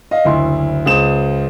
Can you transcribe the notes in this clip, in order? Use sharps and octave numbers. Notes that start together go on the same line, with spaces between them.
D#5 F5
F#1 D2 E4 C6
C#2 G#4 C5 D#6 E7